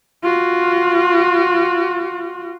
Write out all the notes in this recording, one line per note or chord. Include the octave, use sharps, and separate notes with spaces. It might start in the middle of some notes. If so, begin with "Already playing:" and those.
F4 F#4